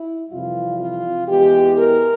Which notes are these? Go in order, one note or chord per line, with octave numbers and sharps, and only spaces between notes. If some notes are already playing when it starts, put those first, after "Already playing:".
Already playing: E4
F2 C3 E3 G3 F4
F4
E2 E3 G#3 G4
A#4